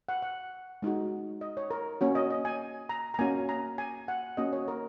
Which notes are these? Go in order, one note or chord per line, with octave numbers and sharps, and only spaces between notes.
F#5
F#5
G#3 D#4 F#4
D#5
C#5
A#4
A#3 C#4 F#4 C#5
D#5
D#5
G#5
A#5
A#5
A#3 C#4 F#4 G#5
A#5
G#5
F#5
A#3 C#4 F#4 D#5
C#5
A#4